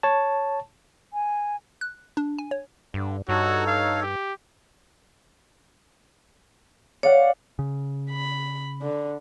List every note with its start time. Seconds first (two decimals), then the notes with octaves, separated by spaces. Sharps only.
0.03 C#5 A5
1.13 G#5
1.81 F#6
2.17 D4
2.39 G#5
2.51 C#5
2.94 G2 D3
3.29 G2 D#4 F#4 A4 C#5
3.67 F5
4.02 G4
7.03 C#5 D5 F5 F#5
7.59 C#3
8.11 B5
8.82 D3